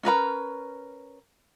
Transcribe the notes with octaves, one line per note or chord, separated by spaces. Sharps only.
C#4 A#4 B4 A#5